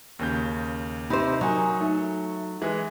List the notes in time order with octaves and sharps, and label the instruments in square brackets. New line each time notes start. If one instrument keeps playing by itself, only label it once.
[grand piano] D#2 C#3 G6
[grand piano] C3 [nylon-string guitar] D#4 C5 [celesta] B5 G6
[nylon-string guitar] F#3 [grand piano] D#4 [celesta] A#4 G#5 C#6
[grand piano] A3 [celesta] D#4
[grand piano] E3 G#3